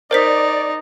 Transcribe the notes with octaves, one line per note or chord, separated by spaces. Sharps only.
D#4 A#4 C5 D5 B6